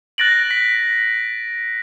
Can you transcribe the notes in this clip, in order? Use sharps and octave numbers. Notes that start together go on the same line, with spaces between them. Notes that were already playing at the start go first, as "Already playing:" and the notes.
F#6 A6 A#6 D7 F#7
B6